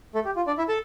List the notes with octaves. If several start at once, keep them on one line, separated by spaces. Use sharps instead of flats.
A3 A4
G4
F4
D4 D5
E4 E5
A4 A5